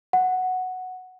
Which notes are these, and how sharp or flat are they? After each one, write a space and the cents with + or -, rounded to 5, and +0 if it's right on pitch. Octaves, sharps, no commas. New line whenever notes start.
F#5 +0